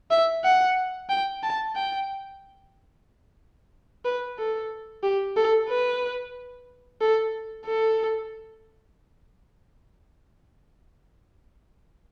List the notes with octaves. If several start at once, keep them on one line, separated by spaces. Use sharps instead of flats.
E5
F#5
G5
A5
G5
B4
A4
G4
A4
B4
A4
A4